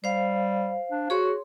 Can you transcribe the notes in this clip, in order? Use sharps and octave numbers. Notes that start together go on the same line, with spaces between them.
G3 C5 F5
D4
F#4 G#4 C#5 C6